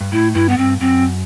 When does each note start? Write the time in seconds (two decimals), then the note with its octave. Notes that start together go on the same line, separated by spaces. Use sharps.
0.01 G2
0.12 A2 E4
0.34 G2 E4
0.49 B3
0.58 G2 C4
0.80 F#2 C4